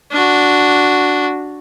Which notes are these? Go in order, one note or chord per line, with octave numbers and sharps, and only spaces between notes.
D4 F#4